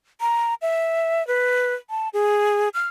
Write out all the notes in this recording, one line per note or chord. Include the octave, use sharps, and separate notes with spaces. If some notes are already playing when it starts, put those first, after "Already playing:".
A#5
E5
B4
A5
G#4
F6